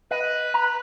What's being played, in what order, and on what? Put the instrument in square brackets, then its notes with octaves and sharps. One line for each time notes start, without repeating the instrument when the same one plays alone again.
[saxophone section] B4 [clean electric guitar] D#5
[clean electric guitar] A#5